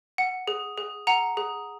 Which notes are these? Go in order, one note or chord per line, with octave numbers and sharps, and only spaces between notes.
F#5
G#4
G#4
F#5 A#5
G#4